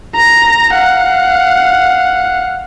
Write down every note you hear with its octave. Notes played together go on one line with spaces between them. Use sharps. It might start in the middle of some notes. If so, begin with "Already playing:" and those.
A#5 A#6
F5 F#5